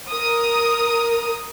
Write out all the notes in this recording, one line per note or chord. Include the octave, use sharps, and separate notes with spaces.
A#4 D#6